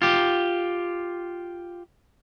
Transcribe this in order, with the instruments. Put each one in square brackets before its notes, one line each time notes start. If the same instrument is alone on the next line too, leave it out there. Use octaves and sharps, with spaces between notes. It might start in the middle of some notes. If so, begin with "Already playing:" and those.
[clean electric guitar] F4 G4